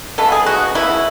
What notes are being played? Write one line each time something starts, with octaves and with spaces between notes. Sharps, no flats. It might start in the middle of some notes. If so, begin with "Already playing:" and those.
C#3 G#3 B3 A4
G#4
F#4
C#3 G#3 B3 E4